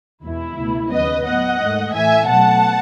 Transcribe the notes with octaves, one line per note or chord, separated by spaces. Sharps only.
E2 B2 G#3 E4
C#2 B2 A3
D#2 C#3 F#3 B3 B4 D#5
A2 F#3 B3 D#5 F#5
G#2 D#3 A3
A2 E3 A3 E5 G#5
B2 F#3 A3 F#5 A5